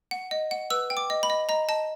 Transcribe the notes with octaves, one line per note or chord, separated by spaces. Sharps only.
F#5
D#5
F#5
B4 E6
G5
D6
D#5
B5
D#5
D#5 A#5
D#5 A5